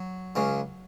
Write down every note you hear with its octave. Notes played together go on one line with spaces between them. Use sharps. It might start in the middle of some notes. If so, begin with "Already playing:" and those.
Already playing: F#3
C#2 C#3